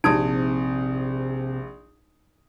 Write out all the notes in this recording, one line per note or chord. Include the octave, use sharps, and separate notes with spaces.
A#1 C3 D#4 D#6 D7